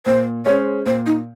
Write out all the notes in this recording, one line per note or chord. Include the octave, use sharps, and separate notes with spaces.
A#2 C5
G#3 C#4 G#4 C5 C#5
A#2 C5
D#4